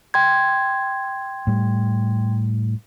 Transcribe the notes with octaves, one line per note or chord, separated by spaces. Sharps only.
G5 C6 G#6
A2 G3